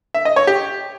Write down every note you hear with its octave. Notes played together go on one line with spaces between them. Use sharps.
E5
D#5
C#5
G4